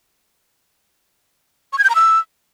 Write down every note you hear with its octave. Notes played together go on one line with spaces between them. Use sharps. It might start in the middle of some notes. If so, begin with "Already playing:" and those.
C#6
G#6
G6
A#5
E6